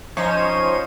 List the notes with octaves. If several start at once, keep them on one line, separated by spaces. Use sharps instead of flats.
F3 C#4 D#4 C5 C#5 D#7